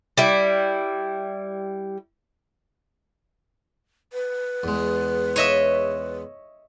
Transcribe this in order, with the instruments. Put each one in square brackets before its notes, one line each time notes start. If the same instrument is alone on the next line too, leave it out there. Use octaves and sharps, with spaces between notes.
[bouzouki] G3 E4
[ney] B4
[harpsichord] E2 G#3
[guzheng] C#5 D#5 E5